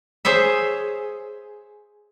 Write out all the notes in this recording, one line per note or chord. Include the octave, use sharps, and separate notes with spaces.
G#4 C5 C#5 E5